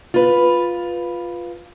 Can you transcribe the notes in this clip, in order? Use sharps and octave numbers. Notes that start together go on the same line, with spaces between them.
F4 B4